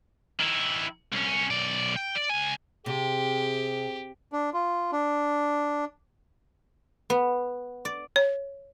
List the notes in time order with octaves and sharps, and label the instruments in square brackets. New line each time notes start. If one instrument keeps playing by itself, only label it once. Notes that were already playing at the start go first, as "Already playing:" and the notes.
[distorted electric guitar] D#3 E4
C2 C#4
B1 D5
G5
D5
C#2 G#5
[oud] C3 [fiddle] G4 [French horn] G#4
[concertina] D4
F4
D4
[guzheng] B3
D5
[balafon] C#5